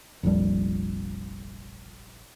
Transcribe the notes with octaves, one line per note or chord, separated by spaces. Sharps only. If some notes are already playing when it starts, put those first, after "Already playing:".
F1 A#1 F2 G3